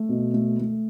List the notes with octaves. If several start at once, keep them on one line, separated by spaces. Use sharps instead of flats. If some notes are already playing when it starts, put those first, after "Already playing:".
Already playing: A3
B2
A3
A3